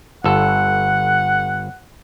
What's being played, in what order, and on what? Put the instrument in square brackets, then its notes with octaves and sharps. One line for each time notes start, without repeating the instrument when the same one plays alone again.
[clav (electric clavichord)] G1 A4 [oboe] F#5